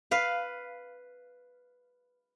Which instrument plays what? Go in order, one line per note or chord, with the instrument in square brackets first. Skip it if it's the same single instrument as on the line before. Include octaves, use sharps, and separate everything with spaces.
[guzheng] B4 F5